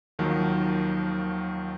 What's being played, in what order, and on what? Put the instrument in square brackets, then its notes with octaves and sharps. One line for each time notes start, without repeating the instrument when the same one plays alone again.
[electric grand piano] D#2 D#3 F3 F#3